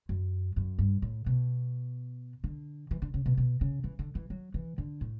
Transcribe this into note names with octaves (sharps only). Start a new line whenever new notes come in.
F#2
F#2
G2
A2
B2
D3
E3
D3
C#3
B2
B2
C#3
E3
D3
E3
F#3
E3
D3
A2